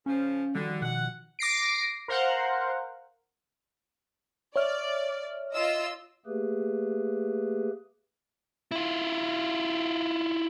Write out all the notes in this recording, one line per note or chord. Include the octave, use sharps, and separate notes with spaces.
C#3 F3 C#4
D3 D#3 F3 G3 F#4
B2 F#5
D6 A#6 C7 D7
A#4 C5 F5 F#5
C#5 D5 E5 F6
F4 D#5 E6
A3 A#3 G4 G#4 B4
E4 F4